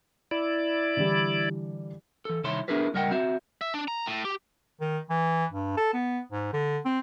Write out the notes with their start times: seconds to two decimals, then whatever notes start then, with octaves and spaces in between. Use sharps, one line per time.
0.31 E4 D5
0.97 D3 E3 G3
2.25 E3 A4
2.44 C2 D#3 E4 C#5 C6
2.68 B3 D4 E4 G#4 A#4 B4
2.94 C#2 G3 A#4 D#5 F#5 G5
3.11 C4 F#4 E5
3.61 E5
3.74 D4
3.88 A#5
4.07 A2
4.25 G4
4.81 D#3
5.10 E3
5.52 G2
5.77 A4
5.94 B3
6.32 G#2
6.53 D3
6.85 C4